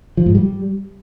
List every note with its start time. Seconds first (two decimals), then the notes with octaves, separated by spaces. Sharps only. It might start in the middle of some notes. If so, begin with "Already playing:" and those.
0.17 F3
0.26 G#2
0.35 G3